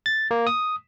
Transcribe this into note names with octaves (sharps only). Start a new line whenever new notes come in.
A6
A#3
D#6